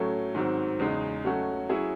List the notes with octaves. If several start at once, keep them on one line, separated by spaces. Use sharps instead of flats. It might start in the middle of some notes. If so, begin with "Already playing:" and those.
Already playing: A2 F#3 A3 C#4
G#2 D#3 F#3 C4
E2 C#3 G#3 D#4
F#3 A3 C#4 F#4
F#3 C#4 E4 G#4